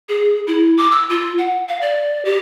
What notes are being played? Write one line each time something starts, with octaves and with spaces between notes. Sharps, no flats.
G#4
E4
D6
E6
F4
F#5
F5
D5
G4